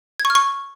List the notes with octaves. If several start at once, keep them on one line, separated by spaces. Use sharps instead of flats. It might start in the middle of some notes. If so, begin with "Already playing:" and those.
G#6
C#6
F6
C#6